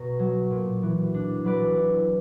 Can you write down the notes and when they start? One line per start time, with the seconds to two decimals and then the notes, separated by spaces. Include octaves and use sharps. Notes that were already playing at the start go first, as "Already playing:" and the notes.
Already playing: B2 A#5 C#6
0.19 F#3
0.51 A#2
0.83 E3
1.14 D4
1.44 F#3 B4 D5
1.77 E4